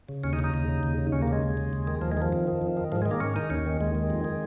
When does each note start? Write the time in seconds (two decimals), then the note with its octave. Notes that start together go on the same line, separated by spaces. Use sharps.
0.09 C#3
0.23 D#2 C#4
0.33 D#4
0.39 C#3
0.44 D#4
0.54 D#2
0.68 C#3
0.83 D#2
0.98 C#3
1.12 D#2 C#4
1.22 A#3
1.28 C#3 G#3
1.43 D#2
1.57 C#3
1.73 D#2
1.87 D#3
2.01 D#2 F3
2.12 G#3
2.17 D#3 F3
2.32 F2
2.47 D#3
2.61 F2
2.77 D#3
2.92 G#2 F3
3.02 D#3 G#3
3.11 A#3
3.20 G#2 C#4
3.36 D#3 D#4
3.50 D#2 C#4
3.66 D#3
3.80 D#2 G#3
3.95 D#3
4.10 F2
4.24 D#3